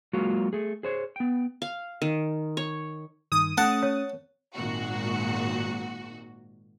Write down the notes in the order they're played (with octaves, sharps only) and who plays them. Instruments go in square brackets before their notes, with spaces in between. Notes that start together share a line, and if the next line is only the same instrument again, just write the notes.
[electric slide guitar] F#3 G#3 A#3 F4 F#4
A3 G#4
G#4 C5 C#5
B3 G5
[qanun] F5
D#3
C#5
[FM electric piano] G2 D#3 [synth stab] D#6
[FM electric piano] A3 C#4 [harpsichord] F#5 A5
[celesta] C#5
[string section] G#1 A#2 F#4